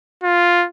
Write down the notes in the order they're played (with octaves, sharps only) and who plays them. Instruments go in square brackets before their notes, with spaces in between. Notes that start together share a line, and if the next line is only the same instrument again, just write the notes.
[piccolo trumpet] F4